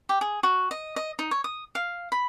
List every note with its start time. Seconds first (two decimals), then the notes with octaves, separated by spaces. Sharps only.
0.09 G4
0.21 G#4
0.43 F#4
0.71 D#5
0.96 D#5
1.19 D#4
1.31 C#5
1.44 D#6
1.75 F5
2.12 B5